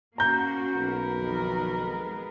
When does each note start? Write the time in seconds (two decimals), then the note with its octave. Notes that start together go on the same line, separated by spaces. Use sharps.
0.18 A#3 C#4 F#4 A#5 G6
0.74 B1 A#4 B4
1.16 F2 D#3 G3
1.85 G#3 B3